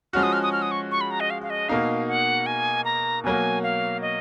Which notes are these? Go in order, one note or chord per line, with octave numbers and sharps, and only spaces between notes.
F3 G#3 C#4 F#4 F6
D#6
F6
D#6
F6
D#6
C#6
C#6
B5
A#5
D#5
F5
F5
D#5
B2 A#3 D#4 F5
F#5
G#5
A#5
B2 F#3 A#3 G#5
F5
D#5